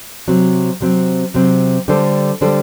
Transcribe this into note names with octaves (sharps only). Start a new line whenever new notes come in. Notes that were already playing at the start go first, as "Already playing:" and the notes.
C3 F#3 C4
C3 F#3 C4
C3 F#3 C4
D3 G3 D4 A4 C5
D3 G3 D4 A4 C5